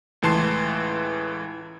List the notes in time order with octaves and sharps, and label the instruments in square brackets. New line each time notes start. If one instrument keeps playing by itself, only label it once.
[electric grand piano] C#2 A2 E3 A5 C6 C7